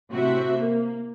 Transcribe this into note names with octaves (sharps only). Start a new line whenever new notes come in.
A2 C3 F#4 C5 E5
A#3